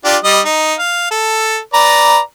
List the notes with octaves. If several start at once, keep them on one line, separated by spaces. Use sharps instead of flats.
D4 F4 G4
G3 D#5
D#4
F5
A4
B4 D5 A#5